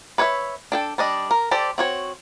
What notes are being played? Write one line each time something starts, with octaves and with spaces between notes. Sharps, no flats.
B4 C#5 D#5 E5
D4 A4 G5
G3 D4 D#5
A#4
G4 A4 C5 D5
C4 F#4 C#5